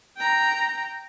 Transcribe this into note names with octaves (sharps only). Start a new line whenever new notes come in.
G5 A#5